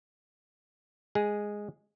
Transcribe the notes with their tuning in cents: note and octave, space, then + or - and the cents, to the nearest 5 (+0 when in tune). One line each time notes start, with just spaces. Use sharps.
G#3 -5 G#4 +0